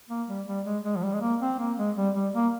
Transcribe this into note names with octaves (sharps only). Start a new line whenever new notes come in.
A#3
G3
G3
G#3
G#3
F3
G3
G#3
A#3
C4
A#3
G#3
G3
G3
A#3